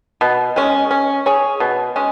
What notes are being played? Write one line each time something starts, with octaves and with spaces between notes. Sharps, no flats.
B2
G#3 C#4
C#4
G#4 C#5
B2
G#3 C#4